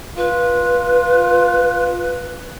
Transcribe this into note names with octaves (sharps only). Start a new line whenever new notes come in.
F4 B4